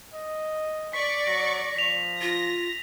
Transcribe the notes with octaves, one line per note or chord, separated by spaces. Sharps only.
D#5
D5 C#6 B6
F#3 A#6
F3 B6 F7
F4 A#6